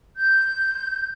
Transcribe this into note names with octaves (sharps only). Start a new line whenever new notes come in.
G6